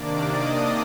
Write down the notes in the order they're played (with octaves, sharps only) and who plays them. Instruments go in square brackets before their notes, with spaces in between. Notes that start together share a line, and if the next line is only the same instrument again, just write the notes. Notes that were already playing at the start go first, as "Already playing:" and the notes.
Already playing: [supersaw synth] C3 D#3 A#3 D4 D5 D6
D#5 D#6